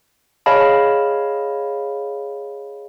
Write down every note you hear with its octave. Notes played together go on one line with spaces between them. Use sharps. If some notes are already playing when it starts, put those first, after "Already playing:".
G#4 C#5 D#5 F5 A5 B5